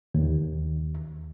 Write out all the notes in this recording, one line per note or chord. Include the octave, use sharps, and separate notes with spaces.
D#2